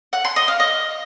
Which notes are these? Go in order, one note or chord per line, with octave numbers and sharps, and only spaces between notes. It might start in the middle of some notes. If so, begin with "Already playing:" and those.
F#5
C6
D#5
F5
D#5